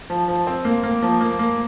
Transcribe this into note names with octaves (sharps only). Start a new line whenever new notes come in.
F3
F3
C4
A#3
A#3
F3
A#3
A#3